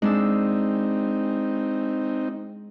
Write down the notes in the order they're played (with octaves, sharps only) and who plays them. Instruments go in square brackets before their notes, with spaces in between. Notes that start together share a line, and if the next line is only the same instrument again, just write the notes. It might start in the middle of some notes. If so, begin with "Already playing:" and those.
[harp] G#3 D4 E6 [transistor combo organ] C4 D#4